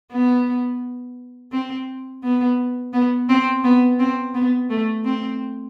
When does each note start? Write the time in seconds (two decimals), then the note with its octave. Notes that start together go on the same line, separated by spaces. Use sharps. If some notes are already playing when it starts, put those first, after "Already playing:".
0.12 B3
1.52 C4
2.23 B3
2.93 B3
3.29 C4
3.64 B3
3.99 C4
4.34 B3
4.70 A3
5.05 C4